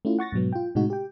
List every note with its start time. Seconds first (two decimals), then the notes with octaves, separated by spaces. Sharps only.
0.05 A3 C#4 E4 F4
0.19 F#5 C#6 A6 A#6
0.32 G#2 B2 F#3 B3
0.53 F4 G5
0.75 A2 C3 G#3 D#4 F#4
0.90 G4 G5